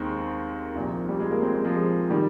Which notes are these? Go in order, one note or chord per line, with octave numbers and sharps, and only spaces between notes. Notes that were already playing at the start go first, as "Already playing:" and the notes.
Already playing: D#2 D#3 G#3 C4
C2 A#2 F3
G3
G#3
A#3
G#3 C4
F3 G#3
D#3 G3